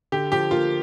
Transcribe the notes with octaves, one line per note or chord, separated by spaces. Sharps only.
D3 G4
F3 G4
A#3 F4